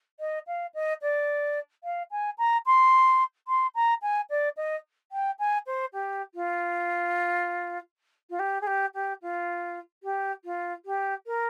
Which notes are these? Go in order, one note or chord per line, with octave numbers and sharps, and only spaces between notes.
D#5
F5
D#5
D5
F5
G#5
A#5
C6
C6
A#5
G#5
D5
D#5
G5
G#5
C5
G4
F4
F4
G4
G#4
G4
G4
F4
G4
F4
G4
A#4